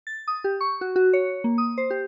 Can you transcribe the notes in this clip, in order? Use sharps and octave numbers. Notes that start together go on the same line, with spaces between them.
A6
D#6
G4
C#6
F#4
F#4
C#5
A#3
D#6
C5
G4